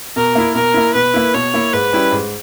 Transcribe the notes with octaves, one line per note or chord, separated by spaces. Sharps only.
B2 A#4
A#3 E4
B2 A#4
A#3 E4
B2 B4
A#3 E4
B2 C#5
A#3 E4
G#2 B4
G3 C#4 E4
G#2